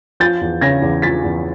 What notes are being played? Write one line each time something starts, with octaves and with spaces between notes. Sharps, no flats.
F3 G6 A6
E2
C#3 G#6 A#6
E2
F3 A6 B6
E2